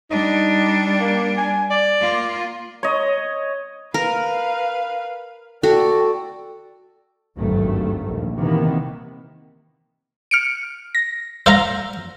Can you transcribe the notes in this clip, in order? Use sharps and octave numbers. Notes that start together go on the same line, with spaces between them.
G3 D4 D#4
A#3
G#5
D5
A#3 F4
C#5 D#5
A#4 B4 F5
F#4 A4 D5 G5
G#1 D2 G2 F#3 A3
A#1 D#2
C3 D#3 E3 A#3 B3
F6 C#7 D7
A#6
C5 F5 A#5 E6 A#6